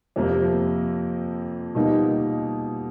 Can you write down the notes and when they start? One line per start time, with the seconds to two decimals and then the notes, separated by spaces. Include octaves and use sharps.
0.16 F2 C3 F3 A#3
1.75 B2 G3 A#3 D#4